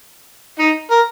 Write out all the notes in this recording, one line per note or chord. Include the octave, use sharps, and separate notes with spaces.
D#4
A#4